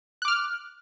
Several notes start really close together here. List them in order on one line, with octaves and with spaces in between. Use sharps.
F#6 D6 F6